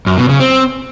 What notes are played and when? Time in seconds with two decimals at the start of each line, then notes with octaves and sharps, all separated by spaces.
0.07 F#2
0.18 B2
0.29 C#3
0.40 C4